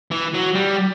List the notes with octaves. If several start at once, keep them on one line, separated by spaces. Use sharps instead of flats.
E3
F#3
G3